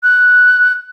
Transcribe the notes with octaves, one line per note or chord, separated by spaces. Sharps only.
F#6